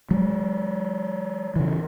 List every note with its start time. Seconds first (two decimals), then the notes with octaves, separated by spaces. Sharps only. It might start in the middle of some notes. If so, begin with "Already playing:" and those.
0.11 F#3 G#3
1.56 C#3 E3